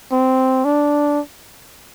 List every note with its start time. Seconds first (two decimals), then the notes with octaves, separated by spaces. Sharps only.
0.12 C4
0.65 D4